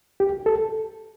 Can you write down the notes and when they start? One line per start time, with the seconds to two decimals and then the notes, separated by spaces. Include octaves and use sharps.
0.20 G4
0.46 A4